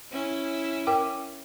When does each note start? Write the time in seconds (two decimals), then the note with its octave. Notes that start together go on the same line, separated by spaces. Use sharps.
0.12 C#4 E4
0.87 A#4 G5 D6